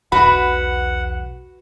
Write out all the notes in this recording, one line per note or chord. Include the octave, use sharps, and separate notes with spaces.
B1 E2 F#4 B4 F#5 B5